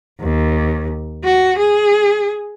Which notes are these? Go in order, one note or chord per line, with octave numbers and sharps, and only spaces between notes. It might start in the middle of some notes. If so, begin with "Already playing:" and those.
D#2
F#4
G#4